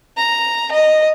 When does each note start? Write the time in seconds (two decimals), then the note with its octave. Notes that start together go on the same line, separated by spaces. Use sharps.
0.17 A#5
0.71 D#5